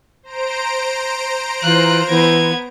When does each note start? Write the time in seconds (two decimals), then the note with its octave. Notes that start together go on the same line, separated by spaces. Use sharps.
0.23 C5 A#5 D7
1.63 E3 F4 F#6
2.09 E3 B3 G#6